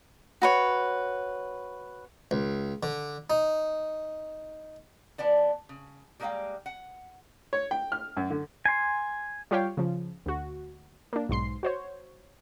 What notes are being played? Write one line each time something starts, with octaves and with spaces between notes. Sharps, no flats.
F#4 B4 C#5
C#2
D3
D#4
E3 B3 D5 A5
C#3
G3 G#3 A#3 B4 F5 G5
F#5
C#5
G5
F6
F#2
D3
G#5 C6
G3 F4 G4 C#5 F5 G5
C#3 F3
D2 F#4
A#3 D4
B1 G#2 C6 C7
F#4 C5 C#5